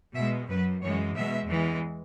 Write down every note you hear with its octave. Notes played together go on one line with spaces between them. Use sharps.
B2 G#3 E5
F#2 F#3 B4
F#2 E3 G#3 C#5
B2 G#3 E5
E2 E3 G#3